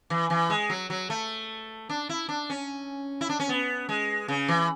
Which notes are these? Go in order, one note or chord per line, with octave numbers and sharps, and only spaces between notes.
E3
E3
G#3
F#3
F#3
A3
D4
E4
D4
C#4
E4
D4
C#4
B3
G#3
C#3
E3